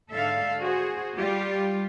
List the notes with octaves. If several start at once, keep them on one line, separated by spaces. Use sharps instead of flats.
G#2 D3 A4 E5 F5
F#4 G#4 C5
G3 F4 G4